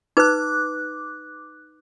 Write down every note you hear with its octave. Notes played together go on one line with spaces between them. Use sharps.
D#4 B4 D6 F#6